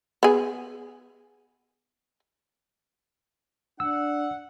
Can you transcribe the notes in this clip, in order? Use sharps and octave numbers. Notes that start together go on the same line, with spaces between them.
B3 G#4
D4 F#5 E6